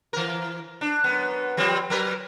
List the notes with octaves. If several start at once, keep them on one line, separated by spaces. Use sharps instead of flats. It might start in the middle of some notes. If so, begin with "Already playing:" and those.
E3 A#4
D4
F#2 B3
F3 G3 C4
F#3 A#4 B4